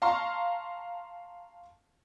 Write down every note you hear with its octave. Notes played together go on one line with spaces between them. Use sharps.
F5 A5 A#5 C6 C#6 F6